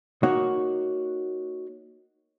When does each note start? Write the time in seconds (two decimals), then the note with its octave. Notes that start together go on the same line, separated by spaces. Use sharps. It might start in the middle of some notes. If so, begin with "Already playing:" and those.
0.23 A#3 D#4 F#4 C#5